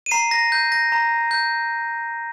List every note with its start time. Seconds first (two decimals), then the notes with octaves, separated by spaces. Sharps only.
0.06 D#7
0.11 A#5 C7
0.31 A#6
0.52 G6
0.72 A#6
0.92 A#5
1.31 G6